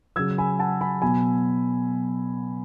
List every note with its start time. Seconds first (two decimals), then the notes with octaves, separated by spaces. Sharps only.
0.16 C#3 F#3 E6 G#6
0.38 G#5 B5
0.59 F#5 A5
0.81 G#5 B5
1.02 B2 F#3 G#5 B5